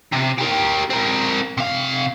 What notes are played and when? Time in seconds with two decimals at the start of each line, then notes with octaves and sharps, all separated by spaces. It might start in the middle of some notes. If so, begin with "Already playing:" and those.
0.12 C3
0.38 G4 A#4
0.90 C4 A#4
1.58 C3 F5